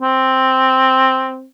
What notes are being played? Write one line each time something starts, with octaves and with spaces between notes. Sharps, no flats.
C4